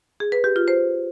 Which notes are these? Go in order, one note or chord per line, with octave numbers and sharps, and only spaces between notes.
G#4
B4
G4
F4
C5